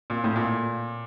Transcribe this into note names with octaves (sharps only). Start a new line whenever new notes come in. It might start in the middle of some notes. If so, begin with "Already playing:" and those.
A#2
A2
A#2